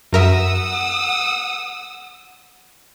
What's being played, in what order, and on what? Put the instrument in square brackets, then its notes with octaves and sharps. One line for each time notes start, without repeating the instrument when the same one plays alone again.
[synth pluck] F#2 A#4 E5 [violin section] F#5 D#6 E6